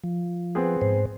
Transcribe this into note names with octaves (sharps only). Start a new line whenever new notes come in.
F3
B3 C4 G#4
G#2 C5